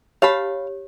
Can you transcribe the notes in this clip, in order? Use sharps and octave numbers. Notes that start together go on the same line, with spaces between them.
G4 C#5 F5 A5 B5